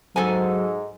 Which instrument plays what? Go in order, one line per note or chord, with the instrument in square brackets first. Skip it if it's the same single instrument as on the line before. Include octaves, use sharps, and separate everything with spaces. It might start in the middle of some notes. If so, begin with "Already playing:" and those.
[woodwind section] G#2 [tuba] F#3 [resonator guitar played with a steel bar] A4 G#5